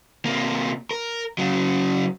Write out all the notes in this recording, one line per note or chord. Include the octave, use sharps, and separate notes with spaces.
C3 A#3
A#4
C#3 F#3